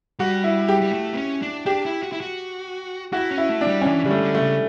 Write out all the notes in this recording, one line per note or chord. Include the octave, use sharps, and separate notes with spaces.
G3 F#4
E4
G4
G3
A3
B3
C#4
D4
D4 G4
E4
F#4
E4
F#4
E4 F#4
C#4
E4
A3
D4
G3
C#4
E3 D4
D3 G3
A3
D3
A3
C#3